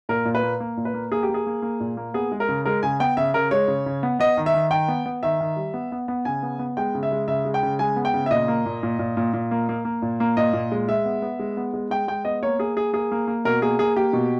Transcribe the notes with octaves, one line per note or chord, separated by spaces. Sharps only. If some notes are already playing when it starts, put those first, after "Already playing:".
A#2 A#4
A#2
B4
A#3
A#3
A#2
B4
A#3
A#3 G#4
G4
A#3
G#4
A#3
A#3
A#2
A#3
B3 G#4
G#3
A#4
C#3
G#3 A#4
C#3 G#5
B3 G5
C#3 E5
C#3 A#4
G#3 C#5
C#3
C#3
B3
B3 D#5
D#3
E5
D#3
D#3 G5
B3
B3
D#3 E5
D#3
G3
B3
B3
B3
C#3 G#5
B3
B3
G#3 G5
C#3
E5
G#3
C#3 E5
G#3
G5
C#3
G#3 G#5
B3
G5
C#3
E5
A#2 D#5
A#3
A#2
A#2
A#2
A#2
A#2
A#3
A#3
A#3
A#2
A#3
A#2 D#5
A#2
G#3
G#3 E5
B3
B3
G#3
B3
G#3
G#3 G5
G#3 G5
B3 D#5
A#3 C#5
A#3 G#4
A#3 G#4
A#3 G#4
A#3
A#3
B2 A#4
A#3 G#4
A#3 G#4
A#3 G4
B2